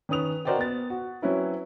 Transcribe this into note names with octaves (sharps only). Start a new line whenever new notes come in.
D#3 C#4 B4 D#6 F7
F#4 A#4 C5 D5 D#5 G5
B3 A6
F#4
F#3 C4 C#4 E4 B4